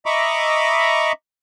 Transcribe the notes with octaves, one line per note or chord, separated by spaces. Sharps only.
D#5 E5 A#5 B5 C#6 D6